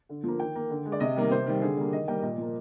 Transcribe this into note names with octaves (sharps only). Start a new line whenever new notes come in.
D3
F3 A#3
D#3 G5
A#3
D3
G#3
D5
C3 D#5
D#3 G3 A#3
C3 C5
D#3 G3
D3 G#4
G3 A#3
D#3 D#5
G3 A#3 G5
A#2 D#5
F3 A#3